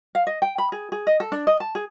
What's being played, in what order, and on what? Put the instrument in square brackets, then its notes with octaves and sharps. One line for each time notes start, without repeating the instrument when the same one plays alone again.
[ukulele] F5
D#5
G5
B5
G#4
G#4
D#5
A4
D4
D#5
A5
G#4